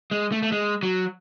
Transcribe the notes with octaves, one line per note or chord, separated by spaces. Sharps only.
G#3
A3
A3
G#3
F#3